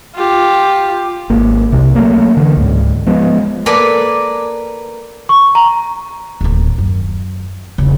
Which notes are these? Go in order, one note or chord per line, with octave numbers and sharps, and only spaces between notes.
F4 G4
G#1 A#3
C2 C3
F#3 A3 A#3
D3 E3
C#2 G#2
F3 G#3 B3
A#3 A4 B4 D5 G#5
C#6
A#5
D1 D#2
F#2
E1 C#3